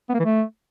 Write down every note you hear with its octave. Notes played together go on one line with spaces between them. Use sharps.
B3
A#3
E3
A3